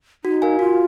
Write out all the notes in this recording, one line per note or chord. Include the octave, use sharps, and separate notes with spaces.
D#4 F#4
A#4 F5 G#5
F4 F#4